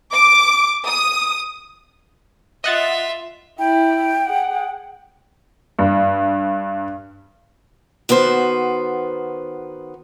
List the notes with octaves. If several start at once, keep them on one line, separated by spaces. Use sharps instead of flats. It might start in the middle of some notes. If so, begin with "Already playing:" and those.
D6
D#6
F4 D#5 E5 F#5 A6
E4 G5
G#4 F#5
G2
D#3 B3 F#4 C5